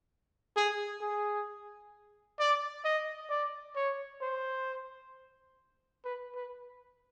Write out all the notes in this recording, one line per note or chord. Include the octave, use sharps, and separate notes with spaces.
G#4
G#4
D5
D#5
D5
C#5
C5
B4
B4